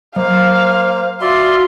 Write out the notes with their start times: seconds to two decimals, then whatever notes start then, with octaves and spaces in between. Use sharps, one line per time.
0.16 F#3 A#3 C5 F5
1.21 F4 F#4 D5 E5 C6